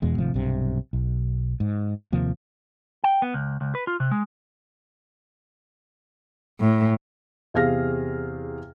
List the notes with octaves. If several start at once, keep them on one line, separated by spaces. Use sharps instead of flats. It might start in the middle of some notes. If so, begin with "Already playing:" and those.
E2 B2 G#3
G#1 C3 F3 A3
B1 G2 C3
B1
G#2
D#2 C3 F3 A#3
G5
B3
C#2
C#2
B4
F4
C3
G#3
A2
E2 C3 G#4 F5 F6 A#6